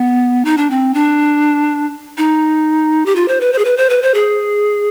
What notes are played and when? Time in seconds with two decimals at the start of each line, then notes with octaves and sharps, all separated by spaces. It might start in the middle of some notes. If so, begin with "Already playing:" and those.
Already playing: B3
0.45 D#4
0.57 D4
0.70 C4
0.94 D4
2.18 D#4
3.06 G4
3.16 F4
3.28 C5
3.41 B4
3.53 C5
3.59 G#4
3.65 B4
3.77 C5
3.90 B4
4.02 C5
4.14 G#4